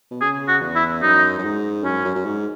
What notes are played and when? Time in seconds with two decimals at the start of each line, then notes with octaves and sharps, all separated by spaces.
0.11 B2
0.21 C#3 G#4
0.48 F#4
0.62 E2
0.76 E4
1.02 F#2 D#4
1.38 F#2
1.44 G#2
1.84 F#2 C#4
2.05 F#2
2.15 F#2
2.25 G#2